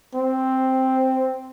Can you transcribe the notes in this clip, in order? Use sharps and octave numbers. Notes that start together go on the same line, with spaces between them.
C4